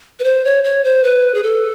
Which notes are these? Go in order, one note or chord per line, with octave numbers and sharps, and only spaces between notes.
B4
C5
C#5
C#5
C5
B4
G#4
A4